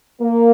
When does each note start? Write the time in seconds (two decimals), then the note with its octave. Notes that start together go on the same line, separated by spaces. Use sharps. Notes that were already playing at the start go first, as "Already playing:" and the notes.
0.22 A#3